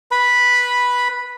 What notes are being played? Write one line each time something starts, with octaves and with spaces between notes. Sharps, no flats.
B4 B5